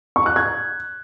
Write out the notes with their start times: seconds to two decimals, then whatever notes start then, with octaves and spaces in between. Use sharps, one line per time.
0.16 C#6
0.26 F#6
0.36 G#6